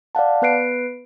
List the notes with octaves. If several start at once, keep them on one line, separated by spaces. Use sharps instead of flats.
D5 F5 F#5 A5
B3 B4 F#6 C7 D7